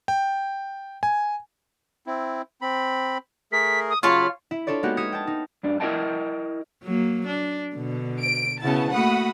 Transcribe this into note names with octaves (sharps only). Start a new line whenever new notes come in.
G5
G#5
C4 E4
C4 B5
A3 G#4 A#4 B6
D#6
C#3 F#3 F4 C#5 A5 B5 F6
E4 E5
D4 F4 A4 C#5 D5
G#3 A#3 B3 D#4 F#4 G4
D#6 F6 G#6 B6 C#7 E7
G5 A5
D#4
F#2 D4
E4 G4 A#4 D#5 G5 A5
F#3 A#3
D4
B2 D3
D7
C#3 B3 E4 F#4 A5
A3 A#3 F#4 F#5 B5 D#6